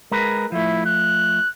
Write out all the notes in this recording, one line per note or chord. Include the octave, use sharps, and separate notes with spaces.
G#3 A#4 B4
F3 A3 E4
F#6